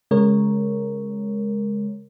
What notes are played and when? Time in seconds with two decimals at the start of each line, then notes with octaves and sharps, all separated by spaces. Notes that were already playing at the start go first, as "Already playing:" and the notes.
0.11 C#3 G#3 A#4 C#5